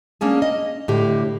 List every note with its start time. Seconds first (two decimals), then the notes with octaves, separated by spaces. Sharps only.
0.21 A#3 C#4 D4 G#4
0.42 D#5
0.88 A2 D3 G4